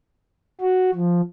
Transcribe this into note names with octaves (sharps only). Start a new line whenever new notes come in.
F#4
F3